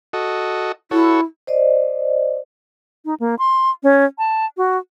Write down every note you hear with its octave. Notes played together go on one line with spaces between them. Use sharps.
F#4 A4 D#5
E4 F#4 A4 C#5
C5 D5 D#5
D#4
A#3
C6
C#4
A5
F#4